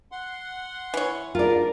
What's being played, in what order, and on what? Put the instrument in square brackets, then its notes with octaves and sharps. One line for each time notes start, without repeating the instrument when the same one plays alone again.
[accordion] F#5 C6
[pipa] E3 C#5
[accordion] G#2 [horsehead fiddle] D4 A#4 [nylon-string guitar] F4 D5